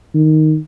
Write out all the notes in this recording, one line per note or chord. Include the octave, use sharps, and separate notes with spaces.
D#3